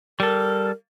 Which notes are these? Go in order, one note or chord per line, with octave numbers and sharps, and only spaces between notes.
G3 A4 A#4